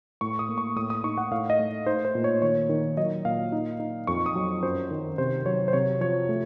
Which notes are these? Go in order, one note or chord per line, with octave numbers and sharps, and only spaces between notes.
A2 C#6
D#6
A#3
C#6
A2 D#6
D#6
D#4 C#6
F#5
A2 F5
D#5
A3
D#4 C5
C5
A#2
C#5
D#3 C#5
D#3
F#3 D#5
A#2 F5
D#4
D#4
F2 C#6
D#6
F#3
F#2 C5
D#3
C3 C5
F#3 C#5
C5
C3 C#5
F3 C#5
A3